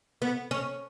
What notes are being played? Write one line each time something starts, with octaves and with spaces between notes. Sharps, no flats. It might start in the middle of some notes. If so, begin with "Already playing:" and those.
B3
C#4